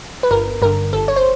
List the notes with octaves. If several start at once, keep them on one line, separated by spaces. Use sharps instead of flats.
B4
G1 A#4
G2 D3 A#4
G1 A4
C#5
C5